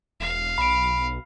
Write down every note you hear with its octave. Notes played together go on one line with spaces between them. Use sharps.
E1 F5
B1 B5 D7